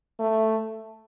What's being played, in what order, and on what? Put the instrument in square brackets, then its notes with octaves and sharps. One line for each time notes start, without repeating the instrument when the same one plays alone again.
[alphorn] A3